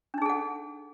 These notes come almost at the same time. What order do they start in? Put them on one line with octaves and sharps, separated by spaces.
D4 D#4 G#4 A4 F#5